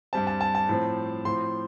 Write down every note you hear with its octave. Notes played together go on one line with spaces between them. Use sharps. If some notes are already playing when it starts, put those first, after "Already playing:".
G2 G3 C4 A5
A5
A5
A5
A2 F3 C4
A2 F3 C4 C6